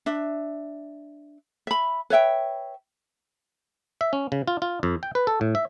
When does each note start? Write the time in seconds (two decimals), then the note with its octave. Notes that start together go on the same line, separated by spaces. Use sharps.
0.06 D4 E5
1.67 E5 B5
2.10 B4 C#5 E5 G5
4.01 E5
4.13 C#4
4.32 C#3
4.48 F4
4.62 F4
4.83 F2
5.03 G5
5.15 B4
5.27 A4
5.41 A2
5.55 E5